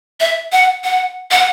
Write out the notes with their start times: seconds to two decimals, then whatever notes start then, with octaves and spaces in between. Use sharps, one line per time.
0.20 E5
0.52 F#5
0.84 F#5
1.31 F#5